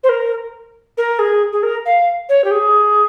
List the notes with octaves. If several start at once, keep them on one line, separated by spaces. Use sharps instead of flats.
C5
A#4
A#4
G#4
G#4
A#4
F5
C#5
G4
G#4